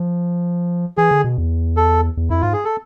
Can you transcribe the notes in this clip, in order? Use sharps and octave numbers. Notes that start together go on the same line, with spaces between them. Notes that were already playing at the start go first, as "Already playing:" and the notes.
Already playing: F3
E3 G#4
D3
B2
E2
A4
E2
F2 E4
G#2 F4
G#4
A4